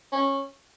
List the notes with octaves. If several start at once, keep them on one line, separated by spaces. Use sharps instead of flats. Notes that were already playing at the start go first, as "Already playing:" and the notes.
C#4